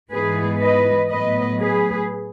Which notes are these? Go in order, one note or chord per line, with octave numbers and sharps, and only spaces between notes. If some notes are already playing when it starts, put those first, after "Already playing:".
G#2 E3 G#3 B3 D#4 G#4 B4
B4 D#5
A2 F#3 B3 B4 D#5
G#4 B4